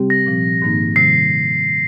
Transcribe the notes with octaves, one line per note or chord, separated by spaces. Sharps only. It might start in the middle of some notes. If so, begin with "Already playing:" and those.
Already playing: C3 G3 C4 G4
A#6
A#2 F3 C4
G#2 D#3 A#3 D#4
C3 D#3 G3 C7